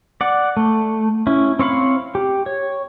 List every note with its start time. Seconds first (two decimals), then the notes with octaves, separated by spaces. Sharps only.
0.21 D5 F#5
0.57 A3
1.27 C#4 E4
1.59 C4 C#5 F5 B5
2.15 G4
2.46 C#5